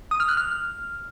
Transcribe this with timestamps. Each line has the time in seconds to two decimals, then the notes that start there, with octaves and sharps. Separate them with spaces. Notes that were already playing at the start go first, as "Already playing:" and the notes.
0.11 D#6
0.20 F6
0.29 F#6
0.37 F6